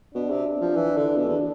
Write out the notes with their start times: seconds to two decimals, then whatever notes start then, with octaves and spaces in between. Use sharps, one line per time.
0.14 B2 D4
0.30 C3
0.61 F3
0.76 E3
0.97 D3
1.17 B2
1.28 E2